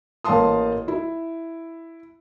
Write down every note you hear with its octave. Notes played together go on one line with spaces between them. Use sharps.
A1 A#3 F5 A5 C6 D#6
E4